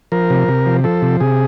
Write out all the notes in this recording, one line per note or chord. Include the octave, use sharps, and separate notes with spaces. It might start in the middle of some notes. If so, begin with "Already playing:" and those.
F3 A#4
C3
C3
F3
F3 A4
C3
C3 G#4